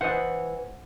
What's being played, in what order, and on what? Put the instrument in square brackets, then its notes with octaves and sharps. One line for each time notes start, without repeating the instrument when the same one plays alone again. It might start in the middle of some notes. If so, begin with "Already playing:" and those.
[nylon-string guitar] E3 B4 [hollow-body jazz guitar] C5 D#5 [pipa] F#5